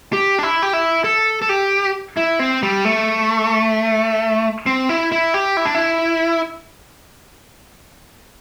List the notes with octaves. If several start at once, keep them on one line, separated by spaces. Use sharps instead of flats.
G4
D4
E4
G4
E4
A4
A4
G4
E4
C4
G3
A3
C4
E4
E4
G4
E4
D4
E4